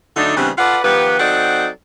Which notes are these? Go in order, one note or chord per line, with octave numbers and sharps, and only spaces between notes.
D3 F#3 A3 D4 D#4
C#3 E3 G3 B3 C4 D4
F4 A4 B4 D5 F#5
D#3 F3 B3 G4 B4
F#3 C4 D#4 A4 D5 F#5